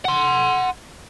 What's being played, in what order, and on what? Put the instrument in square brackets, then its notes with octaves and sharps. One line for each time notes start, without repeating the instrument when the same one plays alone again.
[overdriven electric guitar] F#5 C6